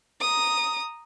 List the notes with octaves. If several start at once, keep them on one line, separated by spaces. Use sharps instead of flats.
A#5 D#6